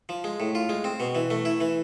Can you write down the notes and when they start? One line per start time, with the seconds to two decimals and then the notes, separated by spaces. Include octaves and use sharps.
0.09 F3
0.24 G#3
0.40 A2
0.55 F4
0.69 G#3
0.84 C4
1.00 B2
1.15 E3
1.30 A3
1.45 E4
1.61 E3